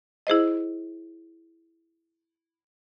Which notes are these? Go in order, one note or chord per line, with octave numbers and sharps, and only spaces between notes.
E4 G#4 C5 D#5